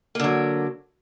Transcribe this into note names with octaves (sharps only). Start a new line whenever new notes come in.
D3 F#3 A#3